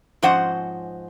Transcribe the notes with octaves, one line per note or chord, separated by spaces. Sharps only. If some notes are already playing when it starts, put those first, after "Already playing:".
G#2 F3 C#4 C5 D#5 F#5